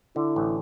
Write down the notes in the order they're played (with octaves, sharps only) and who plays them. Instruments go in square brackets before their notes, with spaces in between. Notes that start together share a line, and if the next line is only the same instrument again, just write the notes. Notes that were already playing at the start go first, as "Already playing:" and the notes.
[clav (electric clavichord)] D3 [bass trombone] E4
[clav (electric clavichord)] A1